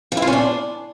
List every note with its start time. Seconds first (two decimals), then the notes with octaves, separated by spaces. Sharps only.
0.12 F3
0.17 E4
0.22 F4
0.27 C#4
0.33 D4